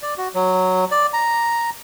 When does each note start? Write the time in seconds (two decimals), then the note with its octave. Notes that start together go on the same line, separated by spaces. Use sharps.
0.02 D5
0.18 F#4
0.35 F#3
0.91 D5
1.13 A#5